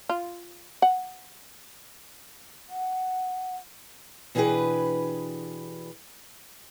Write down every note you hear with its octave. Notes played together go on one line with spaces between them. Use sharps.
F4
F#5
F#5
B2 E3 D4 G4 G#4 B4